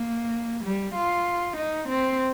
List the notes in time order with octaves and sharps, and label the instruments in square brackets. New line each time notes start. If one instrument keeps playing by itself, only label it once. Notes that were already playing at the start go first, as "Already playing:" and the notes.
Already playing: [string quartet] A#3
G3
F4
D#4
C4